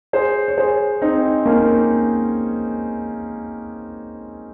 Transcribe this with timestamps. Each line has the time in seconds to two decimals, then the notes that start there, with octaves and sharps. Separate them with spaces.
0.13 G#4 C5
0.48 C#5
0.58 G#4 C5
1.01 C4 D#4
1.45 A#3 C#4